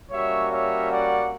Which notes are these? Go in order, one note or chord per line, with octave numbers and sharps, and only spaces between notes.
G3 A#3 C#4 F#4 C#5 E5
C#5 E5
D5 F#5